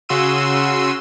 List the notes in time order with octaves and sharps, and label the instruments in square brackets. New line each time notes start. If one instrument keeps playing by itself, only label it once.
[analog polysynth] C#3 F#4 C6 E6 D#7